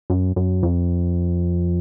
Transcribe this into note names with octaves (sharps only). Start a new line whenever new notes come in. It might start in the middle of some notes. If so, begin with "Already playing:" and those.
F#2
F#2
F2